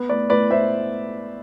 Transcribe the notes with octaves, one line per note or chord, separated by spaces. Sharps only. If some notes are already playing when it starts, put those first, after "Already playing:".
Already playing: B3
A2 B4 D5
A2 B4 D5
A2 C5 E5